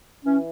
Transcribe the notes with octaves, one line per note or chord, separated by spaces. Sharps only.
E3 C#4